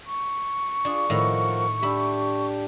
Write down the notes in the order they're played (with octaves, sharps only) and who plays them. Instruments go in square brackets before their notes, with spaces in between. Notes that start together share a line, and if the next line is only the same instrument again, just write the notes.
[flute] C#6
[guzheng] D4 G#4 [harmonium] F4
[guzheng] A2 D#3 [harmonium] F3 A#4 F#5
[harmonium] D4 G4 [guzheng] E5 B5